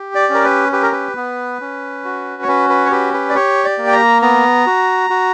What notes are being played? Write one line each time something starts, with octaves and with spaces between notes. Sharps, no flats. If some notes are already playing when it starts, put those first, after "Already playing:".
Already playing: G4
D5
C#4
A#4
B4
G4 B4
A#4
B4
B3
C#4
F#4
C#5
C#4 B4
B4
C#5
G4 B4
B4
D5
G4 C#5
D5
A#3
G5
A#5
B3 A#5
F#4
F#4